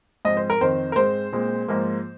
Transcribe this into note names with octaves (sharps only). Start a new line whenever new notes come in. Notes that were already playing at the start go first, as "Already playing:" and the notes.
G#2 F3 C4 D#5
C5
A#4
F2 D#3 C4 C5
A#4
G#2 G#3 C4 C5
A#2 G#3 C4
G#2 F3 A#3